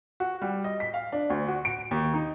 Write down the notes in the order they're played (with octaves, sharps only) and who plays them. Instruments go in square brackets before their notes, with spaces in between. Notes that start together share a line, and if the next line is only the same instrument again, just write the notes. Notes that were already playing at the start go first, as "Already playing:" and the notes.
[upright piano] F#4
G3
D#5
B6
F5
D4
D2
F#4
D7
D#2
D#4